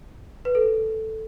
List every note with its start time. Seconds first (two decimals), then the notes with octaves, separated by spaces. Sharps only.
0.45 B4
0.55 A4